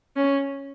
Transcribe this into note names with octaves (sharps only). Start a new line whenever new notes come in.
C#4